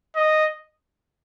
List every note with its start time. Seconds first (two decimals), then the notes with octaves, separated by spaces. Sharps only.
0.16 D#5